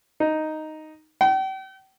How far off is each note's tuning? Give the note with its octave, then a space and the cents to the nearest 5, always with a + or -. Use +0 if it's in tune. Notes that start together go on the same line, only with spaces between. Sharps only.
D#4 +0
G5 -40